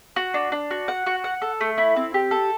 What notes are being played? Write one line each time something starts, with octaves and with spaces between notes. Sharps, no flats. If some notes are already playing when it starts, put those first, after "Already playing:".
F#4
D4
D4
F#4
F#5
F#4
F#5
A4
A3
E4
C4
G4
A4